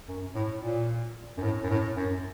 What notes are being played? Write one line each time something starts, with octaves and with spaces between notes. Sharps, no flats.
F#2
A2
A#2
F#2
A2
F#2
A2
F#2